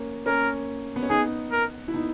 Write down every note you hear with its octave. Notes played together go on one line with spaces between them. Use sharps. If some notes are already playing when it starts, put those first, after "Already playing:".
Already playing: A#3 C#4
A#3 C#4 A#4
B3
C#4
B3 D#4 G#4
A#4
E4
B3 D#4